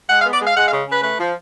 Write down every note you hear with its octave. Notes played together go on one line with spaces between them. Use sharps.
G#3 F#5
F5
B3
D5
G#3 F5
G#3 F#5
F5
C#3
C#3 B4
A3 B4
F3